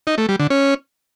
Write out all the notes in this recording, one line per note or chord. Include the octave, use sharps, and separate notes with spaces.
D#4
A3
G3
D3
C#4